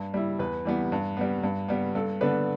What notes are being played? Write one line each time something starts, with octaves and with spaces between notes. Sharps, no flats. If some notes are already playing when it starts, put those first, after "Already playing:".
Already playing: G2
G3 E4
E2 B4
E3 G3 B3
G2
G3 B3
G2
G3 B3
G2 A4
D3 B3 D4 B4